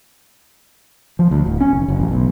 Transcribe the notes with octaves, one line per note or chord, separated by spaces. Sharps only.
F3
D2
D1
C#4
F1
F#1
A1
B1